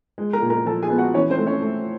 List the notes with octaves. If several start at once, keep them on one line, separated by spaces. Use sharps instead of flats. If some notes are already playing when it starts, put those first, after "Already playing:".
G#3
A#4 A#5
A#2
A#4 A#5
F3 A4 A5
G#4 G#5
B3
F#4 F#5
E3 C#4 C#5
C4 C5
A3
C#4 C#5
A3